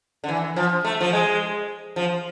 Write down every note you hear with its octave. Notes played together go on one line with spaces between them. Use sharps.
D3
E3
F3
A3
F3
G#3
F3